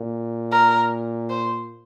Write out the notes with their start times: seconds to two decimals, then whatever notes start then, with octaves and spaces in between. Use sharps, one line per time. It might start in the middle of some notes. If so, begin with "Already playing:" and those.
Already playing: A#2
0.51 A#4
1.29 C5